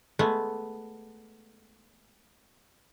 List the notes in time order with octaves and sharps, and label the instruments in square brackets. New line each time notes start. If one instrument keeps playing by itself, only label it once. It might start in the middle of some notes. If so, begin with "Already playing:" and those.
[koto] G#3 A3 B3